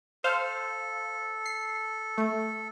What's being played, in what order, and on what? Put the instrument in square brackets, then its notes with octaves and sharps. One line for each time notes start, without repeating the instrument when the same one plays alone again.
[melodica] A4 [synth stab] C5 F5
[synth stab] C7
A3